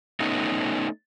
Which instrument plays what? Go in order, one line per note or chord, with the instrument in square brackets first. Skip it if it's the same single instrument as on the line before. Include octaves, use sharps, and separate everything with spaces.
[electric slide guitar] A3 B3 C#4 D#4